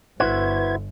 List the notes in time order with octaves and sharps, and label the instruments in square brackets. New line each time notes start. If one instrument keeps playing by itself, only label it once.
[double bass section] G1 [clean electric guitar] E4 F#4 C5 [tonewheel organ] B4 G#6